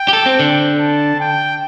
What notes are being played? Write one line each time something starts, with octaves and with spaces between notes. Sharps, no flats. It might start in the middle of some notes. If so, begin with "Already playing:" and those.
Already playing: G5
G4
A4
C4
D3
A5
G5